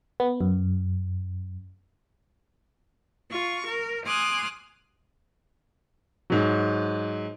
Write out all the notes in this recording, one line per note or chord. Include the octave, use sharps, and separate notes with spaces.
B3
F#2
F4 C#6
A#4
G#5 C6 D6 D#6 F6 F#6
G#2 F#3